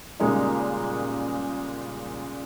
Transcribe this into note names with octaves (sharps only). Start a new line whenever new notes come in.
A#2 C#3 G3 G#3 A#3 D#4